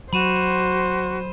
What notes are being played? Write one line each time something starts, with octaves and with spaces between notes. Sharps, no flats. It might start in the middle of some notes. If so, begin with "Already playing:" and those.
F#3 F#4 C5 B5 D#7 E7